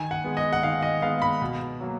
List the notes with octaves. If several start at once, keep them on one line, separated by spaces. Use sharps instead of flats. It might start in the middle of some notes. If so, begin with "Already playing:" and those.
Already playing: D#3 G#5
F#5
G#3 B3
D#5
F#5
D#3 F5
D#5
G#3 B3 F5
B5
B2
F#3 A#3